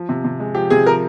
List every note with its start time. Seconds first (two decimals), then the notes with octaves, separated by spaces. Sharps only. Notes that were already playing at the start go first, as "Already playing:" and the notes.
Already playing: F3
0.09 C3
0.24 C3
0.40 G#3
0.55 F3 G4
0.70 C3 G#4
0.86 F3 A#4